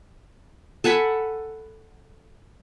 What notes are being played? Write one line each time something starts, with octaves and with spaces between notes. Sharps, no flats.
A4 F#5 G#5 B5